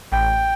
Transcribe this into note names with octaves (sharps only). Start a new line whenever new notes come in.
A1 A2 G5